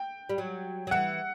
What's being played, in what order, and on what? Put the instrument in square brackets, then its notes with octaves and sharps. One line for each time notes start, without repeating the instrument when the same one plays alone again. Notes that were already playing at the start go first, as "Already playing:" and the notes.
Already playing: [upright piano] G5
[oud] G3
F#3
F#3
[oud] E3 [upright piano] F#5